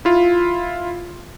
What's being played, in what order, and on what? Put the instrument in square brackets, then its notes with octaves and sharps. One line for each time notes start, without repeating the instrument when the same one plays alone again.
[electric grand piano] E4 F4